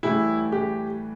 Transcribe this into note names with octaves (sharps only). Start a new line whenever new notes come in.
A2 E3 G3 E4
G4